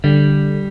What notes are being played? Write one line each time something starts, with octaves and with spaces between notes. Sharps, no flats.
D3 G3